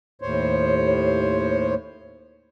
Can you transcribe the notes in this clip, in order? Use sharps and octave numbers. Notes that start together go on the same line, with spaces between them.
D#2 A2 C5 C#5